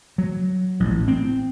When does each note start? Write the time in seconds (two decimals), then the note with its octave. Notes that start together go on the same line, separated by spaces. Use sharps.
0.18 F#3
0.80 A1
1.08 C4